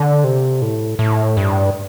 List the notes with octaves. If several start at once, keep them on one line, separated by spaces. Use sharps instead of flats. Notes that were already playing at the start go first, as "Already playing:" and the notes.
Already playing: D3
C3
A2
A2
G2